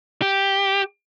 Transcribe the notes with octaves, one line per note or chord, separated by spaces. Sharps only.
G4